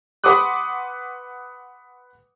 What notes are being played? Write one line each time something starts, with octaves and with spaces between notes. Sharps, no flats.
B4 F#5 C6 D6 D#6 F#6